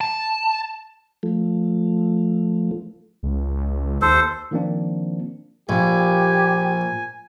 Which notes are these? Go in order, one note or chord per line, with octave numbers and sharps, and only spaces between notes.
A5
F3 A3
C#2
D#2 A4 C5
D#3 F3 A#3 C4 D4
A#1 A#2 G4 G#5